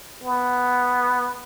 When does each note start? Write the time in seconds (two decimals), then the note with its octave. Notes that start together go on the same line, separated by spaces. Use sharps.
0.24 B3